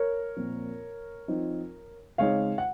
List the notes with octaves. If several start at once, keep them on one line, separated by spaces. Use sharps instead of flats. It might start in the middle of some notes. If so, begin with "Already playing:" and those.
Already playing: A#4 C#5
A#2 F3 C4
F3 C4 D#4
C#3 G#3 C4 D#4 C#5 F5
F#5